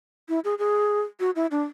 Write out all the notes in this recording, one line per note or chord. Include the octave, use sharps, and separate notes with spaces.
E4
G#4
G#4
F#4
E4
D4